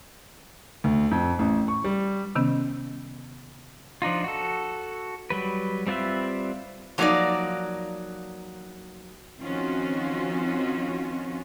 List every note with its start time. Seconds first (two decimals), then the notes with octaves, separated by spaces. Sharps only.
0.84 D2
1.11 F2
1.39 A1
1.68 C#6
1.84 G3
2.35 C3 D#3 B3 C#4
4.02 F3 D4 D#4 F4
4.24 F#4 A4
5.30 F#3 G3 B4
5.87 G3 C4 F4 B4 E5
6.98 F3 F#3 A#3 D4 D#4 D5
9.41 D#3 F3 C4 C#4 F4 F#4